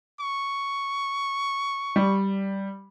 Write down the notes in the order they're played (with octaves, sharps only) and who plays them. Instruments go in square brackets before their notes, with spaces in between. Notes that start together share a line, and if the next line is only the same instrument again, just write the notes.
[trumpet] C#6
[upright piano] G3